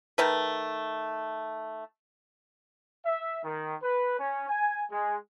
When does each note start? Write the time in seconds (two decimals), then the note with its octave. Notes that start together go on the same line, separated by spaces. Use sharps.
0.18 D#3 A3 B4
3.06 E5
3.44 D#3
3.82 B4
4.19 C#4
4.49 G#5
4.91 G#3